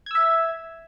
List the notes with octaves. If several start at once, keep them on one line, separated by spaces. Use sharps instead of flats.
E5 E6 G#6